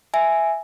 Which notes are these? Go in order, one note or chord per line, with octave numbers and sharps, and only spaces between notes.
E5 G#5